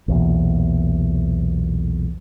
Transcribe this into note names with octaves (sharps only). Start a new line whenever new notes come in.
B1 E2 A#2